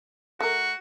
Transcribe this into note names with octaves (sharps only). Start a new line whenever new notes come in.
A3 F#4 A#4